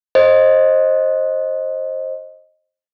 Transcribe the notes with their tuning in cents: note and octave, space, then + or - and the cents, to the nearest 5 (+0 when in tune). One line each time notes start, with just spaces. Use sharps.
C5 +20 D#5 +0